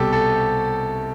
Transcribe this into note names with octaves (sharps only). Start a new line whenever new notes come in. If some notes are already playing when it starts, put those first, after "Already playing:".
Already playing: C2 B2 G3 G4 A4
A4